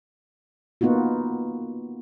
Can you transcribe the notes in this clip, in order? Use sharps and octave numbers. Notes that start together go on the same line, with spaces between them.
A#3 B3 D#4 F4 F#4